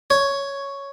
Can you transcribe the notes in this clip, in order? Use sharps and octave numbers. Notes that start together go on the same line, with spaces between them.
C#5